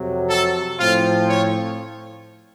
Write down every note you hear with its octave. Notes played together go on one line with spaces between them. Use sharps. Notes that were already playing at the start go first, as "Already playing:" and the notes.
Already playing: F2 C3 F#3
A4
A2 F3 C4 F4
C#5